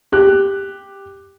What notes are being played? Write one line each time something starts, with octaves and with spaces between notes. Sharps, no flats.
G4 F#6